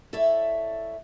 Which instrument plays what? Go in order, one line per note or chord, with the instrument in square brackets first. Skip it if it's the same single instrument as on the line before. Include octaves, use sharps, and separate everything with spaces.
[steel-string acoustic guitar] E4 A4 C#5 D5 E5